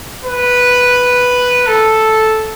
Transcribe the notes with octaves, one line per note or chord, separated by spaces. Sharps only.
B4
A4